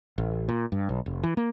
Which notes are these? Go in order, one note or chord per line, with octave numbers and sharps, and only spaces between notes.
A1
A#2
G2
B1
F1
E3
A#3